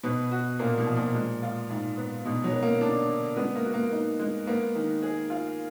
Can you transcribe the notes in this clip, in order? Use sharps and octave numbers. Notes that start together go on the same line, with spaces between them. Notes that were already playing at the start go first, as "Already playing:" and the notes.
B2 B4
F#4
A#2 A#3
B2
F3
A#2
G#3
F4
G#2
B3
B2 G#3
F#3
A#4
A#3
D3 D4
D3
G#3 B3
A#3
F#4
A#3
D#4
G#3
A#3 B3
D#3
G#4
F4